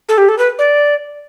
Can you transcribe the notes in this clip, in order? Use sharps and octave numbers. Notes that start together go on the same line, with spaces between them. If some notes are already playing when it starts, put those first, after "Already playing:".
A4
G4
A4
B4
D5